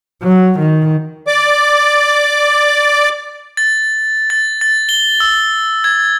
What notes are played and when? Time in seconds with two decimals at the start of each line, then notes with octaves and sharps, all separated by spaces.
0.23 F#3
0.60 D#3
1.27 D5 D6
3.57 A6
4.30 A6
4.61 A6
4.89 G7
5.20 E6
5.84 G#6